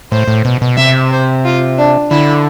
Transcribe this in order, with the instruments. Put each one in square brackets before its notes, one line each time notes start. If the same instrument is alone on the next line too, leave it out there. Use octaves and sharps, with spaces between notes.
[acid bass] A2 [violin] C5
[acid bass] A2
B2
B2
[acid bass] C3 [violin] E5
[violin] C5
F4
D4
[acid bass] D3 [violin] E4